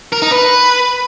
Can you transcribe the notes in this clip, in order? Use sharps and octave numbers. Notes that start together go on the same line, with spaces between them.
A#4
D#4
B4